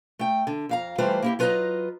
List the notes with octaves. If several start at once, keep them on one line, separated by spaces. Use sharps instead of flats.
A3 G5
D3
F2 F5 A#5
E3 G3 A3 F4 B4 C5
A#3 E4 G4
F#3 F4 B4 C5 D#5 A#5